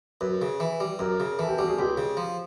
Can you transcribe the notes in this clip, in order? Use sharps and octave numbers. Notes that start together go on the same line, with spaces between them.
F#2 B4
C#3
E3
G3
F#2 A#4
C#3
E3 A4
G4
G3 F#4
G#4
C#2 G4
C#3
F3